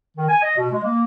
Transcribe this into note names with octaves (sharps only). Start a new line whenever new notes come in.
D#3
G#5
D#5
B2
G#3
A#3